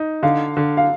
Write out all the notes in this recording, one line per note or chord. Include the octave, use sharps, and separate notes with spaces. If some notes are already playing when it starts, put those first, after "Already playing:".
Already playing: D#4
D3 F5
D3
F5